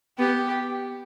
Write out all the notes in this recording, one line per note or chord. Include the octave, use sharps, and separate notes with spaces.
B3 G4